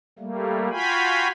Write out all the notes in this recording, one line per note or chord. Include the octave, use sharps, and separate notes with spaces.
G3 A3 A#3
F4 F#4 F5 G5 G#5 B5